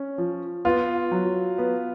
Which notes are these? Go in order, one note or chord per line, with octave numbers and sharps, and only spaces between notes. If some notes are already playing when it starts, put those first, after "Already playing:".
Already playing: C#4
F3
B3 F4
F#3
B3